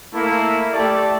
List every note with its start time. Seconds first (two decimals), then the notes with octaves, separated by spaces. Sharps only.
0.14 A3 A#3 E4
0.73 A3 G4 A4 D5